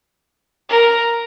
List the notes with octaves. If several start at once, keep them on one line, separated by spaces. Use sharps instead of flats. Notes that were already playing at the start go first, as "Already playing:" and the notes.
A#4